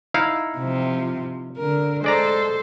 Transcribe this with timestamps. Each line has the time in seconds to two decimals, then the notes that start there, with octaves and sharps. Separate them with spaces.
0.14 D#4 E4 F5
0.58 C3 F3
1.58 D3 A#4
2.04 G#3 A4 C5 D5 A#5